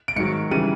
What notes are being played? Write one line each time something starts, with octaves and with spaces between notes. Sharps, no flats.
D7
G#2 D#3 F#3 C#7
C#3 E3 G3 D#7